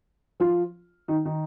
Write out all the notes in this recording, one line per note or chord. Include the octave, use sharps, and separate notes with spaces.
F3 F4
D#3 D#4
D#3 D#4